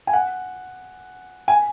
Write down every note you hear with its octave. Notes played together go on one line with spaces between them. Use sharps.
G#5
F#5
G#5